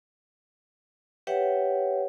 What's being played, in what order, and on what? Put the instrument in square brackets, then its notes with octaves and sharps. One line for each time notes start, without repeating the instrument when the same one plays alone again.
[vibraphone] G4 B4 C#5 E5 F#5 G5